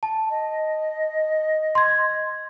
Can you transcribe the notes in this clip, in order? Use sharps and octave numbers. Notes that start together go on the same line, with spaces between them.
A5
D#5
C6 G#6